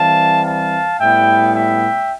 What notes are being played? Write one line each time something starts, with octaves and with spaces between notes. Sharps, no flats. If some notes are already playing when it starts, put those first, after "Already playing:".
Already playing: E3 G3 C4 F5 A5
F5 A5
A2 G3 B3 E4 E5 G5
E5 G5